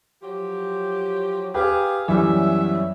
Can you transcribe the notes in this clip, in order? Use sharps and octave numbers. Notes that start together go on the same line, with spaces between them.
F3 F#3 G4
G4 G#4 B4 F5
F#2 E3 G3 B3 C#5 E5